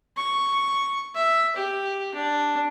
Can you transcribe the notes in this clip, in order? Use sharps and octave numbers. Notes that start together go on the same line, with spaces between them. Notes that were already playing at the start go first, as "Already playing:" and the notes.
C#6
E5
G4
D4